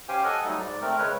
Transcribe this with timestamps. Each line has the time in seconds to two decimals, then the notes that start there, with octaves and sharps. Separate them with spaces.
0.09 C#4 G4 C5 F5 G5 G#5
0.24 A4 D#5 F#5 G#5
0.45 F#3 G3 A3 D#4
0.59 G#2 D5
0.82 A3 C4 A#4
0.99 C#3 G#3 B4 C#5